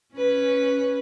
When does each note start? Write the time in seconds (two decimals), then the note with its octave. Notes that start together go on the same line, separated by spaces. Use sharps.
0.14 C#4 B4